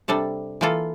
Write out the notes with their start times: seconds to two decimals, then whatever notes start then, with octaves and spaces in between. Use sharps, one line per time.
0.08 C3 G3 D4 A4
0.61 E3 A#3 F4 A4